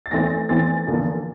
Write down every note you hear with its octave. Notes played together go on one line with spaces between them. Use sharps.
A6
E2 E3 A3 C4 A#6
E2 E3 A3 C4 A6
E2 D3 F3 A#3